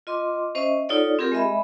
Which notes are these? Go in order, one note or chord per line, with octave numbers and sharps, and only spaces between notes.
F4 D#5 C6 D6
C#4 C5 D#5 E5
D#4 F4 A4 C#5 D5 F#5
C4 F4 G4 G#4 A#4
G#3 D#5 E5 B5